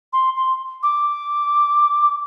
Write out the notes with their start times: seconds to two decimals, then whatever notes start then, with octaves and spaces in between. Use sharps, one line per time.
0.13 C6
0.36 C6
0.83 D6